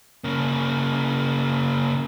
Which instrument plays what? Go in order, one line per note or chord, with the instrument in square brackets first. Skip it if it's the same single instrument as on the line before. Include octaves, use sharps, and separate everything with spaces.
[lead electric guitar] C#3 A#3